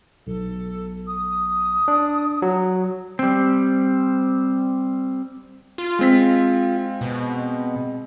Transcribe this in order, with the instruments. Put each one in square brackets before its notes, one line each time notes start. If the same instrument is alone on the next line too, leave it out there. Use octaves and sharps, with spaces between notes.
[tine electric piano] B1 [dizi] A4
[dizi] D#6
[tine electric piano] D4
F#3
[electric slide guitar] G3 C4
[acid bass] F4
[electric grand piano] G#3 C4 B6
[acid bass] B2